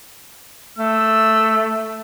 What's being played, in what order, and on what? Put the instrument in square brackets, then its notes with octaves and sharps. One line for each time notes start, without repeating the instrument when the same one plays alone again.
[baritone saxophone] A3 [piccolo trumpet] E6